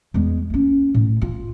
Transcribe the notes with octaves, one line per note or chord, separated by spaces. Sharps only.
E2 G#3
A#3 C#4
A2
F4